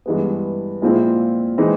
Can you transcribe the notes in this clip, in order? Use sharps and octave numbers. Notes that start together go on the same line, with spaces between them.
G2 E3 G#3 B3
A#2 F3 G#3 C4 E4
E3 G#3 C4 D#4